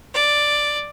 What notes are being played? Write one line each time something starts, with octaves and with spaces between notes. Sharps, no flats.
D5